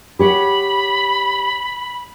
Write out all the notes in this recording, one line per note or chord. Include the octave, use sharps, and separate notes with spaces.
G4 C#5 F#5 B5